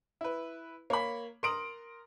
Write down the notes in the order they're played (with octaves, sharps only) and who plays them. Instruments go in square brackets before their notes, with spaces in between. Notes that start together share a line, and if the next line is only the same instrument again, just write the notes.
[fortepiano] E4 B4
[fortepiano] A#3 [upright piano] C#5 B5
[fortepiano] A#4 A#5 D#6 [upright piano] C6 D7 F#7